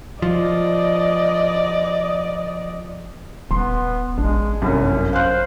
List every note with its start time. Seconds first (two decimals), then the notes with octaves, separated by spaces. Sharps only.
0.22 F3 D5 D#5
3.51 D#1 B3 C6
4.18 A1 G#3 D4
4.62 G1 C2 F#2 C#4
5.13 C5 F5 F6 F#6